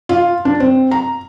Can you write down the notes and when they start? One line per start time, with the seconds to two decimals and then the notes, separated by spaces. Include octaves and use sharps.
0.09 F4
0.45 D4
0.60 C4
0.91 A#5